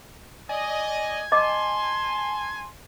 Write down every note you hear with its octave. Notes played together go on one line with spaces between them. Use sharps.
D5 D#5 G#5
D#5 A5 C6 D6